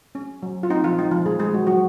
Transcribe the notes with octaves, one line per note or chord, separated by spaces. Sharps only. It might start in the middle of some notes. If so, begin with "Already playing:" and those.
C#4
F#3
F4
C4 D#4
F3 F4
G#3 D#4
F3 F4
D#3 G#3 G#4
G#3 G#4
D#3 F#3 F#4
F#3 F#4